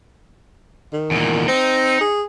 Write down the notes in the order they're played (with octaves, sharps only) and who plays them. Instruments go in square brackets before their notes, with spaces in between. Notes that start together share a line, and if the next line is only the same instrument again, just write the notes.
[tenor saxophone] D#3
[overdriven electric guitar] E2 A#2
[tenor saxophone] C4 [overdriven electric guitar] D#4
[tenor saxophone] G#4